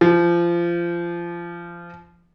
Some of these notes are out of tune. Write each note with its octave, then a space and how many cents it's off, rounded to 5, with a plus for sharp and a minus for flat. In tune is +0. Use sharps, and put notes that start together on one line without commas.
F3 -25